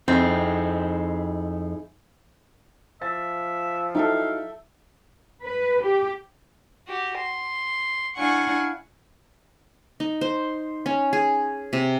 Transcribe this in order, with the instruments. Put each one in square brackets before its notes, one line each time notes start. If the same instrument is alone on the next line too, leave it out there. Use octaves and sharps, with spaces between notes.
[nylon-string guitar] F2 [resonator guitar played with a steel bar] C4 [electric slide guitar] D#4 E4 G#4
[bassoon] F3 [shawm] E5 [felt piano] A6
[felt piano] F#3 D#4 E4 [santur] A4 E5 G5 [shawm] F5
[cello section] B4
G4
[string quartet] F#4 G4
C6
D4 E4 F5 F#5 G#5 C#6
[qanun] D#4
C5
C#4
G#4
C3